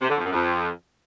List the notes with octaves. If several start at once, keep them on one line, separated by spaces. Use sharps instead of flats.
C3
D3
F2
F#2
F2